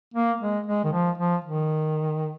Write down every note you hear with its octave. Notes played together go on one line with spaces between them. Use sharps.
A#3
G#3
G#3
D#3
F3
F3
D#3